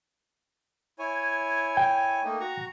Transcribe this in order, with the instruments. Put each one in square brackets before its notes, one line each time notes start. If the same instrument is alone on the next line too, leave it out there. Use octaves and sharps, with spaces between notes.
[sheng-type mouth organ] E4 C#5 G#5
[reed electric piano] G5
[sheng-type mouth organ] A3 A#3 D#4
F#4 A#5 C#6